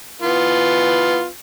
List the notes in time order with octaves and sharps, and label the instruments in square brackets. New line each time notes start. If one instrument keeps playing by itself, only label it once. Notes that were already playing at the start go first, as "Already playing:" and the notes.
[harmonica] E3 B3 F4